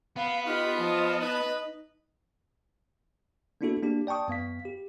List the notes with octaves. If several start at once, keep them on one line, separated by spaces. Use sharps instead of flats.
B3 F5 B5
D#4 F4 G4 B5
F3 D#5 A5
D#4 B4
A#3 B3 D4 E4 F#4 A4
A#3 D4 G4
D5 G5 A5 C#6 D#6
F#2 B3 F5 B6
G4